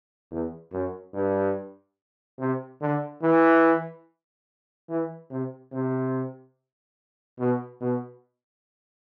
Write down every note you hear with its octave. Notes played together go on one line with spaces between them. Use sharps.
E2
F#2
G2
C3
D3
E3
E3
C3
C3
B2
B2